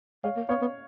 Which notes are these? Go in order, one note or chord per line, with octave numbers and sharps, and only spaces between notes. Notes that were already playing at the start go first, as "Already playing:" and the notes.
G#3 C#5 F5
A#3
B3 C#5 F5
B3